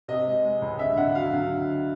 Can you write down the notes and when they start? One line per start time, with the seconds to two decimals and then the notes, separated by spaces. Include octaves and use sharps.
0.08 C3 D#5
0.26 G#3
0.44 G#3
0.62 C#2
0.79 D3 E5
0.97 D3 F#5
1.15 F#3 F5
1.33 D3